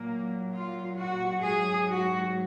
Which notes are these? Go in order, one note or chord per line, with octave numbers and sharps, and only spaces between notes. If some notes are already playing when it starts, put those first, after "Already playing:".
Already playing: A#2 F#3 A#3
F4
F#4
G#2 F#3 G#4
F#4